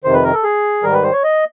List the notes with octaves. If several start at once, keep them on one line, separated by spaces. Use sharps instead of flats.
F2 C3 D#3 C5
B4
A#4
A4
G#4
G#2 D#3 G3 A#4
B4
C5
C#5
D#5